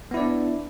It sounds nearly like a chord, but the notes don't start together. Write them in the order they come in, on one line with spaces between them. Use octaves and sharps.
B3 E4 D5 D4